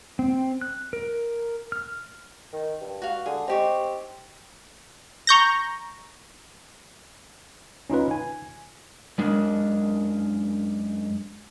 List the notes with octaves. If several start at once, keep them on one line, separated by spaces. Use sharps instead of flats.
C4
F#6
A#4
F6
D#3
G2
F#4 F5
D3 G#4
C4 D#4 G4 C#6
A#5 C#6 G6 A#6
C#4 D#4 F4 B4
G#5
F#2 G#3 D4 A#4